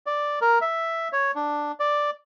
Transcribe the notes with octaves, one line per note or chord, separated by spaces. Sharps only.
D5
A#4
E5
C#5
D4
D5